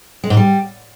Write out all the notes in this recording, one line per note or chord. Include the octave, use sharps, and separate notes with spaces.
G#3
G#2
G3